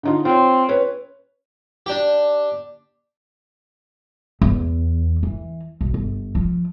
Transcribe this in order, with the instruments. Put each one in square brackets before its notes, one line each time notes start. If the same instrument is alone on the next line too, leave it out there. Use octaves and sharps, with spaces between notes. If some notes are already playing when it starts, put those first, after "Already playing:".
[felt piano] D3 D#4 F4
[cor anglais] C4 [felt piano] F4 C#5
[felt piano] C#4 B4 C#5
[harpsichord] D4 G4
[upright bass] E2
E3
B1
G1
F3